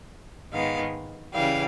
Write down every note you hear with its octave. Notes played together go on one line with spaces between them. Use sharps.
G#2 D#3 G#3 B3 F5
C#3 E3 G3 F5